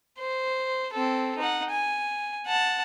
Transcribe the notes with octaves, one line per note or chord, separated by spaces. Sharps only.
C5
C4 A4
D#4 F#5
G#5
F#5 A5